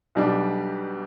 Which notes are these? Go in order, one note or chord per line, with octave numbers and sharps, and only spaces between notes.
B1 B2 G3 D4